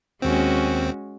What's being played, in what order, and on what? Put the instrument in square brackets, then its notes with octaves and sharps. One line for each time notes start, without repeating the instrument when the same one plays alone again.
[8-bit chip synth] D#2 C4 [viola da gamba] G#3 C#4 F#4